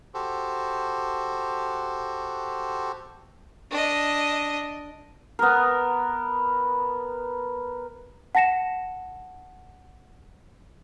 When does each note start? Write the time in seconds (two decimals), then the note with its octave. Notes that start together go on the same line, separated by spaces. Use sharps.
0.14 F#4 G4 A4 C5
3.71 D4 D#5
5.39 B3 A#4
8.35 F#5 A5 A#6 C#7 E7